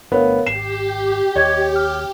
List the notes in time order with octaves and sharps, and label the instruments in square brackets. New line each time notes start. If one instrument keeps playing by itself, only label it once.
[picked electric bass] G1 A3 D4 [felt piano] B3 [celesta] A#4 C#5 F5
[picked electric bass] G#1 [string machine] G4 [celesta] C7 [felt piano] E7
[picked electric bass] D#2 [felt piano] C#5 [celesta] D#5 G#6
[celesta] F6